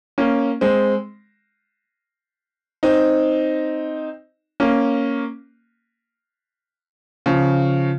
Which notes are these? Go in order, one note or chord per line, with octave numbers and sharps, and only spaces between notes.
A#3 C#4
G#3 C4
C4 D#4
A#3 C#4
C#3 F3